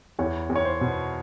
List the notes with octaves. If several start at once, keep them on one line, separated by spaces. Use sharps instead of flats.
E2 C#5
E2
C#5
C5
B2